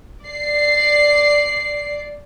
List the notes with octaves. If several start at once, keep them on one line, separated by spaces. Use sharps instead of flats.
D5 C7